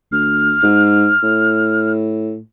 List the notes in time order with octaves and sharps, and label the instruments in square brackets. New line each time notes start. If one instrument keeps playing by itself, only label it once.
[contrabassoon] D2 [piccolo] F6
[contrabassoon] G#2
A2